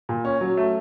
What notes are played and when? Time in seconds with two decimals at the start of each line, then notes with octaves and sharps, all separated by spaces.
0.09 A#2
0.25 C#4
0.41 F#3
0.57 A3